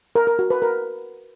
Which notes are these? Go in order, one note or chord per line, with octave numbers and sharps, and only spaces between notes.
A#4
A#4
F#4
B4
A#4